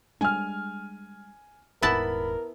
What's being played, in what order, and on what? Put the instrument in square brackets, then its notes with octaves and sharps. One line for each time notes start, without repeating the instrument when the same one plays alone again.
[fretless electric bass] G3 G#3 D4 [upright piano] G#5 F6
[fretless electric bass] D#1 G#2 [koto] B3 E4 A5 [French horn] A#4 [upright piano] B5